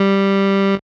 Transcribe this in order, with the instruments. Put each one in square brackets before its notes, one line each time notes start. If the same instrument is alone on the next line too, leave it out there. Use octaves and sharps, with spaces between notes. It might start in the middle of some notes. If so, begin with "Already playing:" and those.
Already playing: [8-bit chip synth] G3